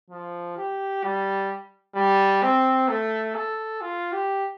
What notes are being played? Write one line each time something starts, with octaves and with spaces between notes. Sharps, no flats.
F3
G4
G3
G3
C4
A3
A4
F4
G4